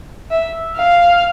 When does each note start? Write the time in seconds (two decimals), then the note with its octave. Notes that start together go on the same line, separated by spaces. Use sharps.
0.31 E5
0.78 F5